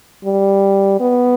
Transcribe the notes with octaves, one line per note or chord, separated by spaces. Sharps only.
G3
B3